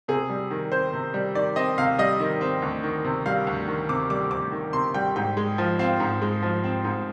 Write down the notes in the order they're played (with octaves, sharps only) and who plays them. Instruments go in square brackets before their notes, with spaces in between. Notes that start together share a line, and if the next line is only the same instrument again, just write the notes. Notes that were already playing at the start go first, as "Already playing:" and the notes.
[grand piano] C3 G#4
G3
D#3
C4 C5
C3
G3
D#3 D5
C4 D#5
C3 F5
G3 D#5
D#3
C4
D2
D#3
C3
G3 F5
D2
D#3
C3 D6
G3 D6
D2 D6
D#3
C3 C6
G3 G5
G#2 G5
G#3
F3
C4 F5
G#2
G#3
F3
C4
G#2